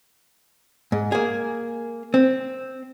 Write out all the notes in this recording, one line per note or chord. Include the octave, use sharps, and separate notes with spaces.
G#2
A#3 G#4
C4